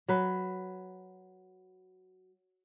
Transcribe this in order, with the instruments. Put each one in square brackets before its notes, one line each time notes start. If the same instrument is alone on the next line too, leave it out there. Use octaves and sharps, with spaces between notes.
[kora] F#3 B4